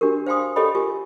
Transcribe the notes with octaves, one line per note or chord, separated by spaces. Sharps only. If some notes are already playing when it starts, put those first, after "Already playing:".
D4 F#4 G4 A#4
C5 F5 G5 G#5 C6 D#6
G4 A4 C#5 D#5 G5 B5
F4 G4 A#4 G#5